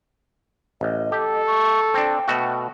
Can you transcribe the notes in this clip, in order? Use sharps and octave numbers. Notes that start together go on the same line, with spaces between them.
A1 D#5
G4 A4
C#6
C4 D4 G5
B2 A3 F#4